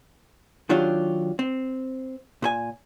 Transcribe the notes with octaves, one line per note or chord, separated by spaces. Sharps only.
D#3 F#3 D4 F4 G4
C4
A#2 C5 G#5